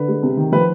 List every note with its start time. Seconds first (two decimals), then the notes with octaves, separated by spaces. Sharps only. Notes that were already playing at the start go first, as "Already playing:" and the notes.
Already playing: D3 B4
0.08 G#3
0.23 C3
0.37 D#3
0.52 F3 B4